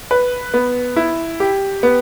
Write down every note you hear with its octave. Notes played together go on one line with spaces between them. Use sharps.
B4
B3
E4
G4
B3